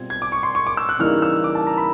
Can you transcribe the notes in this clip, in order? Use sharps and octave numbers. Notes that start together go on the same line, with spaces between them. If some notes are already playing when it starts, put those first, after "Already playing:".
Already playing: B2 G3 C4 F4 G#6
G#6
D6
C#6
C6
C#6
D6
E6
F#6
C#3 E3 G3 A#3 D#4 F6
E6
D6
A5
A#5
B5